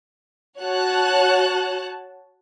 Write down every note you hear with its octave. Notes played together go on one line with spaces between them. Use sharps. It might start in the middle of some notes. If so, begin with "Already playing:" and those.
F#4 C#5 F#5 A5 F#6